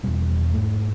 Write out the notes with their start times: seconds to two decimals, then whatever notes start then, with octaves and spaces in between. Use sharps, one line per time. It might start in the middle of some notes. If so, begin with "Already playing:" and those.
0.03 E2 B2 G3
0.53 G#2 A3